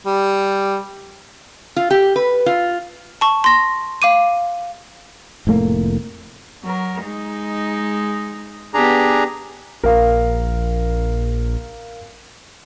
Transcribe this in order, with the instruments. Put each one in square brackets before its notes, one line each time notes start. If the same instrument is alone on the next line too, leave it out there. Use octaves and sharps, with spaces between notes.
[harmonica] G3
[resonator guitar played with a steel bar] F4
G4
B4
F4
[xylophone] A5 C#6
C6 A#6
F5 D6 D#7
[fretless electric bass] F1 A2 A3 A#3
[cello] F#3 A#4
G#3 D#4
[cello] B3 G4 [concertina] D4 G#4 A#5
[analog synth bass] A#1 [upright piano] A#4 F5